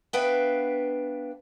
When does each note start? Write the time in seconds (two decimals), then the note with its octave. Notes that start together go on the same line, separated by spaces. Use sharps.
0.13 B3 D4 B4 E5 F5 G5